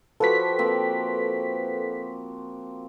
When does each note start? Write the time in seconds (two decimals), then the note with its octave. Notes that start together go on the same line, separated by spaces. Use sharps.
0.20 F3 F#4 G4 A4 B4 B6
0.59 A#3 C4